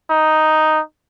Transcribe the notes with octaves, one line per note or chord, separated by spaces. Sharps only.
D#4